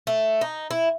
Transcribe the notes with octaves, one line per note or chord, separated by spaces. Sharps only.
A3
D#4
E4